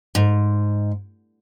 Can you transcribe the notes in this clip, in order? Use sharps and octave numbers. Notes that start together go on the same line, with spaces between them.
G#2